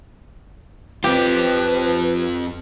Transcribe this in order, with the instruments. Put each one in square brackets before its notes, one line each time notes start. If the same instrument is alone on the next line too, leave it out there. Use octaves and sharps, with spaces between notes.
[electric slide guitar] F2 C4 F4 [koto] G4 [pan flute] B4